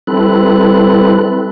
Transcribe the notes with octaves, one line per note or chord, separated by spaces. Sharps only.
G3 C4 E4 A4 B4 F#6